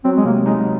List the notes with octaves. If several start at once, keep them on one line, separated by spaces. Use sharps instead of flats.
F#3 C4
G#3
C3 A#3
G#3 D#4